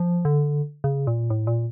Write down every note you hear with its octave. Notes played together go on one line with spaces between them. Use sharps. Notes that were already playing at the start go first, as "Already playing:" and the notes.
Already playing: F3
D3
C#3
A#2
A2
A#2